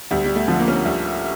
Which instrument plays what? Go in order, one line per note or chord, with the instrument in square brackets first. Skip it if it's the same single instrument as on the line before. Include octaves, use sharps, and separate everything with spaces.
[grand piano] D2 [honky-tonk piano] G3
[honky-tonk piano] G3
A3
[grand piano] D3 F3
[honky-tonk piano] A#3
C#4
A#3
[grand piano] D2 [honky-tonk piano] G3